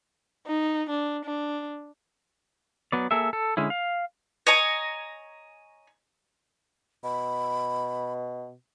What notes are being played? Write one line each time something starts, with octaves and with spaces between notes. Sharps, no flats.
D#4
D4
D4
F#3 B3 D5
A#3 G#4 A4 E5
A4
D3 G#3 C#4 E4
F5
C#5 D#5 G#5 A#5
B2 B5